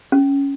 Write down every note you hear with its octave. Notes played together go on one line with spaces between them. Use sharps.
C#4